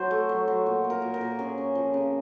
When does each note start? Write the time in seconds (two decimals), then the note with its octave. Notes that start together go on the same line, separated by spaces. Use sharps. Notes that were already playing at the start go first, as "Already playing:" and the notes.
Already playing: F#3 C5
0.11 A3
0.29 F#3
0.48 F#3
0.66 A#2
0.84 A#3
0.90 A#4
1.02 A#2
1.14 A#4
1.21 A#2
1.39 C#4 G#4
1.58 C#4
1.75 F3
1.94 C#3